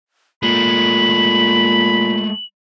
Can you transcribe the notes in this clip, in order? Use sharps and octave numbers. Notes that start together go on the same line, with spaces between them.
A#2 G#3 A3 B5 F#7